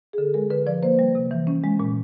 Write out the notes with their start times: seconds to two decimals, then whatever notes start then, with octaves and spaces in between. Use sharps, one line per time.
0.13 G#4
0.18 D3 A4
0.34 G#3 A#4
0.50 D3 B4
0.67 F3 D5
0.83 A#3 C5
0.99 G3
1.15 C3
1.31 E3
1.47 C#4
1.64 G#3
1.80 A#2